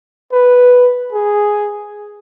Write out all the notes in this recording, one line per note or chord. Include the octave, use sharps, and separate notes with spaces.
B4
G#4